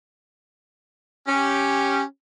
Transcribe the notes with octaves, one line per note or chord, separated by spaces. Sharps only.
C#4 G4